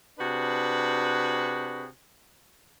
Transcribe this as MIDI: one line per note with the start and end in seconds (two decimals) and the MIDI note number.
0.19 1.87 48
0.19 1.87 62
0.19 1.87 66
0.19 1.87 68
0.19 1.87 71